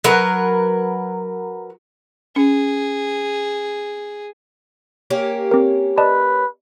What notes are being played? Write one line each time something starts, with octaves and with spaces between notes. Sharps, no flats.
F#3 A#4 B4
C#4 G#4
A#3 C#4 G4
C4 A#4
B4 D5 D#5 A5